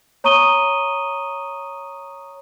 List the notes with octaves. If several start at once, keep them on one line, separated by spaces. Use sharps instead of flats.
C#5 A#5 C#6 D#6 D#7 G7